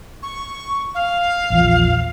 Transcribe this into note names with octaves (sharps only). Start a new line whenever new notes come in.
C#6
F5
A#1 E2 F3